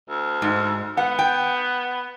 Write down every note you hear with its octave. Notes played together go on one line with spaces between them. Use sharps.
D2
G#2
B3 F#5
G5